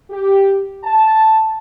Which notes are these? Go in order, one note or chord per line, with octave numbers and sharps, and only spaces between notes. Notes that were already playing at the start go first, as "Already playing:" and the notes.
G4
A5